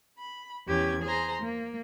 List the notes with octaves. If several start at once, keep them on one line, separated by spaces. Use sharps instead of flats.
B5
E2 C#4 G4 G#6
G#4 C5 A#5 C6
A#3